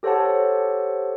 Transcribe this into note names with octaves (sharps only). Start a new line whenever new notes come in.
G4 A4 C5 C#5 F#5 A5